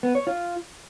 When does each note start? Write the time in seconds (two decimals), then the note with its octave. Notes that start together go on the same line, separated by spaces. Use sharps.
0.03 B3
0.15 C#5
0.27 F4